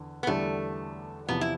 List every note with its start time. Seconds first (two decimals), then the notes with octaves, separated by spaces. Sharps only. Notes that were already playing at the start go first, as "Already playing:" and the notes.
Already playing: E2 D3
0.23 B3
0.27 E2 D3 G3 A3 D4 A4
1.28 E2 C3 F3 B3
1.41 E4